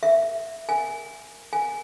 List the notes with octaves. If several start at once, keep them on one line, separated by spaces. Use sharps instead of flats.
E5
G#5
G#5